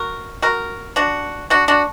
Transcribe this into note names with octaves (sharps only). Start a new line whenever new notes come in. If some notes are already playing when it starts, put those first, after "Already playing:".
Already playing: F#4 A#4
F#4 A#4
D4 F#4
D4 F#4
D4 F#4